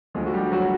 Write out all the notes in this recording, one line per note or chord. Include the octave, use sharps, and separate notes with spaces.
D2 D3 F3 G#3 G#4
F#4
G3 G4
F#3 F#4